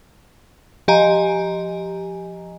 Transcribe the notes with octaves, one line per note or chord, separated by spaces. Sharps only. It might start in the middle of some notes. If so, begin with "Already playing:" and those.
F3 G4 D#5 G#5 A#5